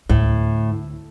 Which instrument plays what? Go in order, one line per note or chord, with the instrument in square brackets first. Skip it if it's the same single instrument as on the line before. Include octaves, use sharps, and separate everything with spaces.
[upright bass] D2 [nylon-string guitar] A2